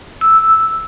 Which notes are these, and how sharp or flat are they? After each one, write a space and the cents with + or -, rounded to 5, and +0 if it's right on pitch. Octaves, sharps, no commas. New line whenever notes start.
E6 -5